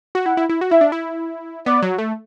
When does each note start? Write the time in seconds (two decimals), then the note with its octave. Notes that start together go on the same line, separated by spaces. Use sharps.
0.15 F#4
0.26 E4 F#5
0.37 E4
0.49 E4
0.61 F#4
0.71 E4 E5
0.81 D4
0.92 E4
1.66 B3 D5
1.82 F#3
1.98 A3